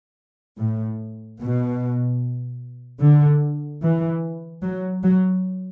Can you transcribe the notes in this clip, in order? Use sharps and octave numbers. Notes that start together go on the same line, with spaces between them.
A2
B2
D3
E3
F#3
F#3